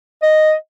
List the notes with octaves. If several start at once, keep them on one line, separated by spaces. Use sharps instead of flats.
D#5